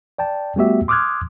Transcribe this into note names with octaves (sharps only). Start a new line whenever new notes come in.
D5 G5 A5
G3 A3 B3 F#4 G4 E5
C6 D6 D#6 F6 F#6 G#6